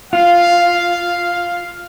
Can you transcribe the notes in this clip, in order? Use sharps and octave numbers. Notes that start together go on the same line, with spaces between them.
F4 F5